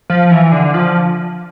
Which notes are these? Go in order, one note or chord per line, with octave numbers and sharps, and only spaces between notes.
F3
E3
D3
F3